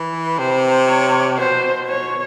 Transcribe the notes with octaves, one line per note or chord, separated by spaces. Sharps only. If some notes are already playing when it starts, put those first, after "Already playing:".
Already playing: E3
C3 C5
C#5
B2 C5
C#5